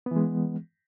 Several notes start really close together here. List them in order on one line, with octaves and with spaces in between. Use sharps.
B3 E3 G#3